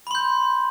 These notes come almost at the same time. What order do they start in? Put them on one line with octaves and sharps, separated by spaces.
B5 C6 G6